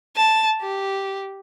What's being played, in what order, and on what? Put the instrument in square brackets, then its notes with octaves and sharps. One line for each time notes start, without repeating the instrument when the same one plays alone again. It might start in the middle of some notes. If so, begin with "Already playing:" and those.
[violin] A5
G4